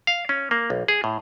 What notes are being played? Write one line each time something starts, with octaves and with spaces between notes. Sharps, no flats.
F5
C#4
A#3
B1
G#4
A2